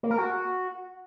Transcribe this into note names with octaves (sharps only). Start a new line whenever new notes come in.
A#3
A#4
F#4